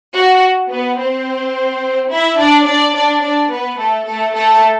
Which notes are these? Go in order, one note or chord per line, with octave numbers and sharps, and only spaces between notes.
F#4
B3 B4
C4 C5
E4 E5
D4 D5
D4 D5
D4 D5
D4 D5
B3 B4
A3 A4
A3 A4
A3 A4